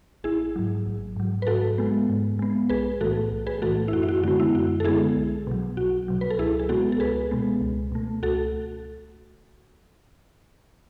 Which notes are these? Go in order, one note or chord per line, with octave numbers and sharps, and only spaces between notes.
A1 E4 G#4
G#2 F#3
A1
G#2 F#3
B4
G#2 F#4 A4
G#3 B3
G#2
G#3 B3
B1 G#4 B4
A2 E3 A3 F#4 A4
B1
G#4 B4
A2 E3 A3 F#4 A4
E4
F#2 F#4
E4
F#4
D3 G#3 B3 F#4
E4
F#2 F#4
A4
D3 G#3 B3 E4 G#4
B1
B2 F#3
B1 F#4
B2 F#3
B4
A4
C#2 E4 G#4
G#4
B2 G#3 B3 F#4 A4
A4
C#2 G#4 B4
B2 G#3 B3
C#2
B2 A3
C#2 F#4 A4